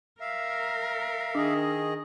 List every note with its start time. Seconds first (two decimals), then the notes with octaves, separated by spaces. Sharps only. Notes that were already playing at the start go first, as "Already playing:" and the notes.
0.21 A#4 E5 F5
1.35 D#3 D4 G#4 D#5